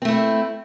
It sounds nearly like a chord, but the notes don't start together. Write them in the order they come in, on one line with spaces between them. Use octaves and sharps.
C4 A3 E4